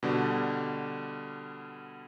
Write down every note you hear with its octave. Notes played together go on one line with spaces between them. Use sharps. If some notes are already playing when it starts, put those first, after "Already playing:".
B2 D3 G3